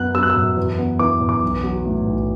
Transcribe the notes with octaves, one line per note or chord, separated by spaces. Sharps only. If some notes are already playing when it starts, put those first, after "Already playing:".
Already playing: F#2 B3 F#6
F#3 E6
F#6
E6
F#2
E2
B3
E3 D6
E2
D6
B1
F#3
A2
B1